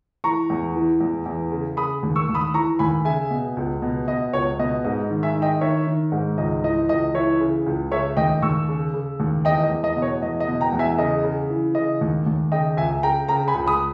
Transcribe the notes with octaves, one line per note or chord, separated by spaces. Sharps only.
E3 A#5 C#6
E2
E3
E2
E2
C#3
C#3 B5 D#6
D#2
C#6 E6
D#2
B5 D#6
E3 A#5 C#6
D#2 G#5 B5
C#3 E5 G#5
B2
C#2
B2
B2 D#5
C#2 C#5
B2 D#5
G#2 D#5
D#3
E5 G#5
D#3
D#5 G5
D#3 C#5 E5
D#3
G#2
C#2 D#5
E3 D#5
C#2 D#5
E3 C#5 E5
C#3
C#2
C#3 C#5 E5
D#2 D#5 G5
D#2 C#6 E6
C#3
C#3
D#2
E2 D#5 G5
D#5
E2
D#5
B2
C#5
E2 D#5
D#5
B2
G5 A#5
E2
E5 G#5
C#3 D#5
C#3
E3
C#3 D#5
D#2
D#2
C#3 D#5 G5
C#2 E5 G#5
C#3 G5 A#5
C#3 G5 A#5
G#5 B5
C#2
B5 D#6